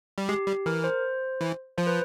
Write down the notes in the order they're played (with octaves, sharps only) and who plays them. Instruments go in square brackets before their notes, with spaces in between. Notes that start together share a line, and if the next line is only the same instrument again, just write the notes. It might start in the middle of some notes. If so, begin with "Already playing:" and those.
[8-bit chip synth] G3
[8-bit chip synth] G#3 [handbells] G4
[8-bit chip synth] G3
[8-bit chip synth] E3 [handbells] A#4
[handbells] C5
[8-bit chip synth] E3
[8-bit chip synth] F3 [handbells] C5
[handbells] B4